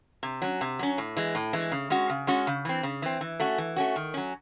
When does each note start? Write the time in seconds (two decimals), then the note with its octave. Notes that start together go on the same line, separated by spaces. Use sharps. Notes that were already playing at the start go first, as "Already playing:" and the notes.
0.23 C3
0.42 F#3 C#4
0.61 C3
0.79 F#3 C#4
0.98 A2
1.17 E3 G#3
1.35 A2
1.53 E3 G#3
1.72 C#3
1.90 G#3 C#4 F#4
2.10 C#3
2.27 G#3 C#4 F#4
2.47 C#3
2.65 E3 C4
2.83 C#3
3.02 E3 C4
3.21 E3
3.40 A3 C#4 F#4
3.58 E3
3.76 A3 C#4 F#4
3.96 D#3
4.14 F#3 C#4